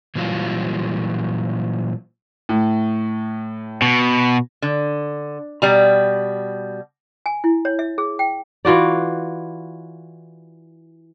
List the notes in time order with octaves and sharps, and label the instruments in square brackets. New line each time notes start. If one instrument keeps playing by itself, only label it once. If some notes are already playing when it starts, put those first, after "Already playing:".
[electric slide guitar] A#2 E3 F#3 G3 F4
[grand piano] A2
[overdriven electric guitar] B2
[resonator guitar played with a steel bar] D3
B2 G3 A#5
[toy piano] G#5
E4
C#5
E5
G#4
G5
[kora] E3 F4 F#4 D5